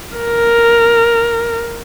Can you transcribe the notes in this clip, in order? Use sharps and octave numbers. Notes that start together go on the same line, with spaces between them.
A#4